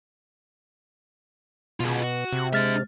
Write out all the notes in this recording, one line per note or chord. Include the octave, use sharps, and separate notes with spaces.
B2 F4 G#4
F#4
C3
G#3 D4 E5 F6 A6